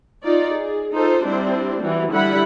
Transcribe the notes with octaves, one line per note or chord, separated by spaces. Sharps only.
D#4 F4 D5
G#4
D#4 F4 A4 C5
G3 C4 D4 E4 C5
E3 G3 F#4
D3 G3 E4 F#5 B5